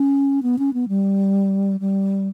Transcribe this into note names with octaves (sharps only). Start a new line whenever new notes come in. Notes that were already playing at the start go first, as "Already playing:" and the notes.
Already playing: C#4
B3
C#4
B3
G3
G3